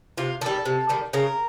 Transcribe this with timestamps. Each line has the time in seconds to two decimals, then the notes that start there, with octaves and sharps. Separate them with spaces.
0.18 C3 F4
0.41 D#3 G3 A4
0.66 C3
0.89 D#3 G3
1.13 C#3 A#4